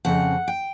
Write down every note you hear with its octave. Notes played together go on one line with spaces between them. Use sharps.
F2 C#3 C4 F#5
G5